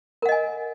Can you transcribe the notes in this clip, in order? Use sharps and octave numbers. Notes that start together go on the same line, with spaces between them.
A#4 D#5 F#5 G#5